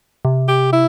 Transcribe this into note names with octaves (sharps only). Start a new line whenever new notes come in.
C3
G4
E4